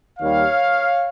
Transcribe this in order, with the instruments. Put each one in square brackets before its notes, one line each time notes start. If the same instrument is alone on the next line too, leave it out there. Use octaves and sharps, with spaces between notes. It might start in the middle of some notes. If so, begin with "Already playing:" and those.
[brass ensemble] D#2 D#3 G3 C#5 F5